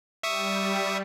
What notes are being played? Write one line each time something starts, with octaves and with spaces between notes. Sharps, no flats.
G3 E5 C#6 D#6